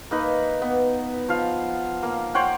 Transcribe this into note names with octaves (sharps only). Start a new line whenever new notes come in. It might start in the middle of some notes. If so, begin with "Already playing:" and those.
A#3 D#4 B4
B3
F3 F5
A#3
C5 C#5 F#5 G5